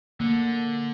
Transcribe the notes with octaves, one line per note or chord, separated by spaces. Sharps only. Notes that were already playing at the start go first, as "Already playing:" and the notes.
D3 A#3